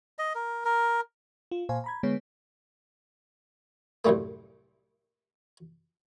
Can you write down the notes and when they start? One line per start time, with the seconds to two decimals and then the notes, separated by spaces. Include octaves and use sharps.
0.19 D#5
0.35 A#4
0.65 A#4
1.51 F4
1.69 A#2 C5 F5 G#5
1.84 A#5 B5 G#6
2.03 D3 G#3 B3 G#4 C#5
4.05 C2 F#2 A2 G3 A3 A#3